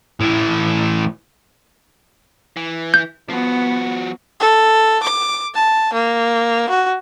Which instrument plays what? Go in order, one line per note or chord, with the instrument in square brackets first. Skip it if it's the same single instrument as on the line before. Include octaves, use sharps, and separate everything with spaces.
[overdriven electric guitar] A2 E3
[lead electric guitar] E3
[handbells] G6
[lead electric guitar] F3 F#4 [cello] B3
[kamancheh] A4
D6
A5
A#3
F#4